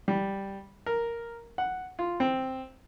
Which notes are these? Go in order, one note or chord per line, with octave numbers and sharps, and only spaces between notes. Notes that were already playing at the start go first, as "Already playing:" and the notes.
G3
A#4
F#5
F4
C4